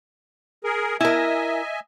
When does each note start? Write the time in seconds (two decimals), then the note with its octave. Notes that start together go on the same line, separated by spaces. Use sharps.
0.64 G#4 A#4
1.00 E4 A#4 D#5 E5 G#5